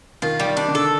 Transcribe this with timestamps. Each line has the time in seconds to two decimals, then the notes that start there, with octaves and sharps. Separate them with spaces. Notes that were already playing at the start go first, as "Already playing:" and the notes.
0.22 D#3 F4
0.40 G3
0.45 D#3
0.57 D4
0.68 D3
0.75 A4